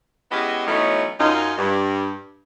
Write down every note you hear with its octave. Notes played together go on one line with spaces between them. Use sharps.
G#3 B3 C#4 E4 G4 D#5
E3 F#3 A3 B3 C#4 D#4
F#2 D#4 F4
G2